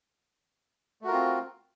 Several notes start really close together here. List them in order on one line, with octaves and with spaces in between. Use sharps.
A3 F#4 A#4 F4 C4